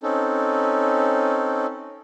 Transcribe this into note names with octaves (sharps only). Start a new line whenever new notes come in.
C4 C#4 D#4 A4